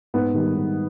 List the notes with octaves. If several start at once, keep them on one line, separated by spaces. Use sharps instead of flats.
G#2 B3
D#3 G3
G#2